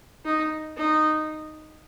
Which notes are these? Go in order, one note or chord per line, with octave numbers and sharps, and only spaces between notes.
D#4
D#4